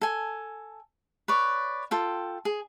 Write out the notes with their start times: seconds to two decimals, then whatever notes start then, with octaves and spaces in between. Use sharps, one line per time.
0.01 A4 G#5
1.28 B4 C#5 D5
1.91 F4 A4 G5
2.45 G#4